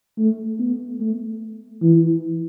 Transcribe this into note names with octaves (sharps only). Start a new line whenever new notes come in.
A3
B3
A3
E3